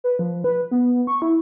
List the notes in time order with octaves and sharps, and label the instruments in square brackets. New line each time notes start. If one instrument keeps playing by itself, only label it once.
[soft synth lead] B4
F3
B4
B3
C#6
E4